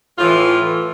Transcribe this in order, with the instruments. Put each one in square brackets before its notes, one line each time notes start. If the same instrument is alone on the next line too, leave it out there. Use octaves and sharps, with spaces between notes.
[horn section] A2 E3 F4